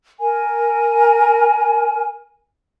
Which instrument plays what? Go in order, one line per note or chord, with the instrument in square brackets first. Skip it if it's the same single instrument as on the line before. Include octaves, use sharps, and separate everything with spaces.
[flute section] A#4 [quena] G#5